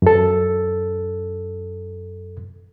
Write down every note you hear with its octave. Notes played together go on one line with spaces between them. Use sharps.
F#2 A4